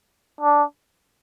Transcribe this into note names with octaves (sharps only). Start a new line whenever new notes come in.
D4